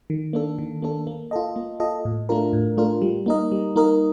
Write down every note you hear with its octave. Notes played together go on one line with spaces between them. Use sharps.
D#3
A#3 D4 A4
D#3
A#3 D4 A4
A#3
F4 A4 D#5
A#3
F4 A4 D#5
A2
A3 D4 F4 A#4
A2
A3 D4 F4 A#4
G3
A#3 D#4 A#4 D#5
G3
A#3 D#4 A#4 D#5